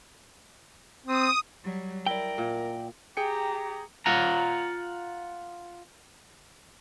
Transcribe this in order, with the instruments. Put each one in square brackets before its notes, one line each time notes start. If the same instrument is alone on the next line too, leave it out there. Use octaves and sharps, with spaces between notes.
[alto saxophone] C4 [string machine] D#6
[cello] F#3 G3
[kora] E4 [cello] A#4 [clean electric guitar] D5 G5
[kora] A#2
[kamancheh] G4 A#5 [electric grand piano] G#4 G5 C#7
[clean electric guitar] F4 F#5 A#5